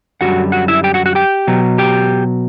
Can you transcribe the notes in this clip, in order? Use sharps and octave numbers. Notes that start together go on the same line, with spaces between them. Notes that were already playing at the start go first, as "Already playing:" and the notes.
F#2 D3 G3 F#4 F#5
F#4 F#5
E4 E5
G4 G5
F#4 F#5
F#4 F#5
G4 G5
B2 F#3
G4 G5